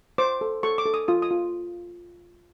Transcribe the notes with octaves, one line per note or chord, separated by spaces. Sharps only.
C5 D6
A4
A4 C#6
D6
A4
D#6
F4 D#6
D#6
F4